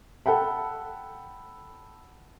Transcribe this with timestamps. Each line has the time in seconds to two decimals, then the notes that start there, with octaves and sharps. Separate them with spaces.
0.26 A4 F#5 G5 B5